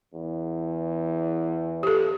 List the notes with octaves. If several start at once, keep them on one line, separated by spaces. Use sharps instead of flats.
E2
G4 A4